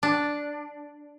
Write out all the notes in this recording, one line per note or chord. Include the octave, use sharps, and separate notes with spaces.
D4